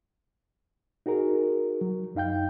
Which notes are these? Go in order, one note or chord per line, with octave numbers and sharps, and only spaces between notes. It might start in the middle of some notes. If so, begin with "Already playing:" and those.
D#4 F#4 G#4 A#4
F#3
F#2 D#4 F5 G5 G6